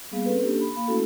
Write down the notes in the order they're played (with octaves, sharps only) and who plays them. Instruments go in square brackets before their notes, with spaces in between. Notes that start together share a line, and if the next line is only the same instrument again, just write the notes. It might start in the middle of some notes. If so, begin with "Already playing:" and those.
[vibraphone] G3 A#3 B3 G#4 F5
C4 C#4 A4 B4
A#3 C#4 D4 G4 A4
B5
A#3 F5 B5
A3 C#4 E4 F#4 A4